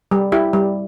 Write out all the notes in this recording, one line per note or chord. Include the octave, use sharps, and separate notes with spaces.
G3
E4 G4
G3